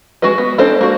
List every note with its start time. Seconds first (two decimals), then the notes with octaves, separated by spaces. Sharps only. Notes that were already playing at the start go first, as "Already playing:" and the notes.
0.22 G#3 F#4 G#4 B4 D#5
0.38 B3
0.58 G#3 C4 D4 A4 C5
0.81 A#3 F#4